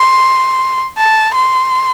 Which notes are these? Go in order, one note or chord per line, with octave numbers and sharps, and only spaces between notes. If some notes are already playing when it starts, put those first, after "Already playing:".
Already playing: C6
A5
C6